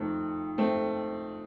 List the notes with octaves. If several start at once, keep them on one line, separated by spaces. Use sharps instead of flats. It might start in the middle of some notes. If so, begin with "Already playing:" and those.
Already playing: F2 D#3 A3 C4
A3 C4